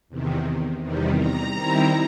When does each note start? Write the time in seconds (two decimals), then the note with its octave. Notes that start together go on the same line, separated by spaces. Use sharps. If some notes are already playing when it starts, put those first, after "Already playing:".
0.09 E2 C3 D#3
0.81 E2 C3 D#3 G3
1.18 A#5
1.55 D#3 G3 C4 E4